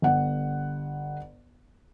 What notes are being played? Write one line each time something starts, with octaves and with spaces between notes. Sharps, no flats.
G1 F#5